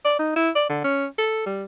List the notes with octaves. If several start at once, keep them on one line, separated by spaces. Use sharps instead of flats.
D5
D#4
E4
D5
D3
C#4
A4
G3